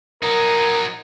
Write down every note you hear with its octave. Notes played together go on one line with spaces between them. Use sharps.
F#3 D#4 A#4